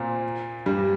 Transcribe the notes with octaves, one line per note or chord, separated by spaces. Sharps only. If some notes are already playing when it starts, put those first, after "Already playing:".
Already playing: A#2 A#3 C4
G2 G3